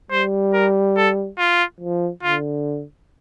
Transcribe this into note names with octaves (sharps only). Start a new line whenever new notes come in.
G3 C5
A#4
A4
F4
F3
D3 F4